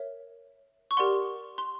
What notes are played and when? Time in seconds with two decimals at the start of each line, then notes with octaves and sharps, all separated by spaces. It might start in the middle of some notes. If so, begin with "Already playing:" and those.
Already playing: A#4 C#5 E5
0.91 C#6
0.97 G4 A#4 D5 F#5 C6
1.58 C6